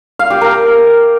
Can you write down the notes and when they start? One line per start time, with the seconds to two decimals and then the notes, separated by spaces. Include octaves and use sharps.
0.19 F5
0.30 G4
0.41 A#4